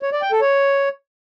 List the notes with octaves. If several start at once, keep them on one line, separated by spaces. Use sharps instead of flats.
C#5
D5
G5
A4
C#5